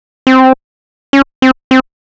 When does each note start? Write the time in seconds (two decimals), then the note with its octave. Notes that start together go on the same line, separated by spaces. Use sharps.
0.27 C4
1.13 C#4
1.42 C4
1.71 C4